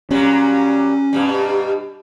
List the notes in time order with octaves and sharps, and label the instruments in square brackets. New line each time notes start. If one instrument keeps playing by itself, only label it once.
[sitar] A#2 F#3 G3 [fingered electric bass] C#4
[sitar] G2 B2 G3